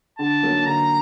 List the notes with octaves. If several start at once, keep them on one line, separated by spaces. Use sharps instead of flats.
D3 A5
F#3 A#3 D#4
D3 A#5